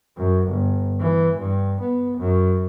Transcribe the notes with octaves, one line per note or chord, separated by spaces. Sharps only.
F#2
G1
E3
G2
B3
F#2